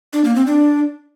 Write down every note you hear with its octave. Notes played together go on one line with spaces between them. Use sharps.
D4
A#3
C4
D4